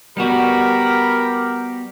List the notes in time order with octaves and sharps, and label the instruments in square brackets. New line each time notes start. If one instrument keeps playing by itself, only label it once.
[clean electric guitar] G3 B3 F#4 [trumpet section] G4 A#4 B5